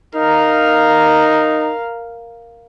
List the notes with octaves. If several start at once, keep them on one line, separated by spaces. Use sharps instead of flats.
D#4 A#4 F5